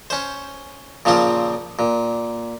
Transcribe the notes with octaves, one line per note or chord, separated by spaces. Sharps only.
C#4 C5
A#2 C#3 F3 C4 F4
A#2